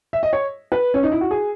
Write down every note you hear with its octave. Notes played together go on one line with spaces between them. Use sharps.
E5
D#5
C#5
B4
C#4
D#4
E4
F#4
G#4